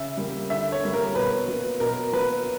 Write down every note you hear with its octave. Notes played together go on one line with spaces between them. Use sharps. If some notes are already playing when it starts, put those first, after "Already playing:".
Already playing: C#3 E5
G3 A#3
D3 E5
C#5
G3 A#3
A#4
B2 B4
F#3 A#3
B2 A#4
F#3 A#3 B4